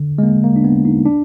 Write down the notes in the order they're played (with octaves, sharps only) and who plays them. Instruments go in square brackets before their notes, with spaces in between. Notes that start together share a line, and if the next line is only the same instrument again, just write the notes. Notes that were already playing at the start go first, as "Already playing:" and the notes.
Already playing: [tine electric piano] D3
G#3
A#3
A#3
D4
B3
D#4
D4